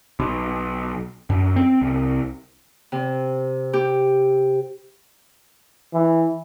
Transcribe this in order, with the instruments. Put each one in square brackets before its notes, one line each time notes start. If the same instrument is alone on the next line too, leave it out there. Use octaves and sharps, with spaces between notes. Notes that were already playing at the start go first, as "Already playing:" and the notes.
[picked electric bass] B1
F#2
C4
C2
[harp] C3
G4
[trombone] E3